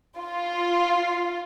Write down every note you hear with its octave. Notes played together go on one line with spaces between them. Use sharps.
F4